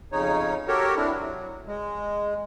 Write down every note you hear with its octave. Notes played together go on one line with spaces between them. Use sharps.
F2 C#3 D#4 C#5
F#4 G4 A4 A#4 C#5
C4 D4 E4
F#3
G#3